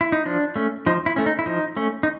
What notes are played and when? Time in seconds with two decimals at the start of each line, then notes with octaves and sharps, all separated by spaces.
0.01 E4
0.12 D#4
0.25 F3 D4
0.56 A3 C#4
0.86 F3 D#4
1.06 E4
1.16 A3 C#4
1.26 D#4
1.39 E4
1.46 F3 D#4
1.77 A3 C#4
2.03 D#4